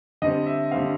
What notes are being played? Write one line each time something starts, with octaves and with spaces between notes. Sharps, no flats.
D3 G3 C4 D#5
E5
D3 G3 C4 F5